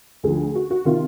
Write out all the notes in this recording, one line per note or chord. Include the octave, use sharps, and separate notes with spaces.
D2 D3 F3 G#4
F#4
F#4
C3 D#3 F4